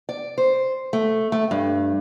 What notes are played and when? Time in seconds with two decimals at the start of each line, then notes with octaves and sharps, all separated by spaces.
0.09 D5
0.38 C5
0.93 A3
1.32 A3
1.51 G2